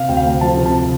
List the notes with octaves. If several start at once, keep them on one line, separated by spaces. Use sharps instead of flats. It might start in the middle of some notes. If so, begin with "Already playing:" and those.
Already playing: C3 F5
D2 G5
F5
A3
F3 A5
C3
A5